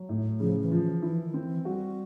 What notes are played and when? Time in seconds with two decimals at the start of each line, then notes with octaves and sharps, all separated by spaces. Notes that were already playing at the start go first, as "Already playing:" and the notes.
Already playing: F#3
0.09 A2
0.40 C#3 F3
0.61 E3
0.71 F3
0.82 E3
1.02 E3 E4
1.23 D#3
1.34 C4
1.44 E3
1.65 G3 F#4